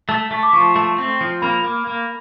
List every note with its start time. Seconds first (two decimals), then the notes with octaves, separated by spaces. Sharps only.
0.09 A3 A5
0.31 A3 A5
0.43 D6
0.53 F3 C#6
0.76 A3
0.98 C4
1.21 F3
1.42 A#3 B5
1.64 A#3
1.87 A#3